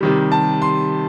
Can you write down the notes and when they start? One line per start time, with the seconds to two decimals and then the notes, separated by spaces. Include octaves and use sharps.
0.01 C3 D#3 G3
0.32 A5
0.62 C6